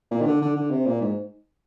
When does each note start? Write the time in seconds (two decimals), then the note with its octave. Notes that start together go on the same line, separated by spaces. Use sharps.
0.11 A#2
0.21 D#3
0.26 D3
0.42 D3
0.56 D3
0.71 C3
0.86 A#2
1.01 G#2